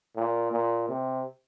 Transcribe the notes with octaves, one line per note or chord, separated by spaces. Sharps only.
A#2
A#2
C3